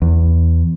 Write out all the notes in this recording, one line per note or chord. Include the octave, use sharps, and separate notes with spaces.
E2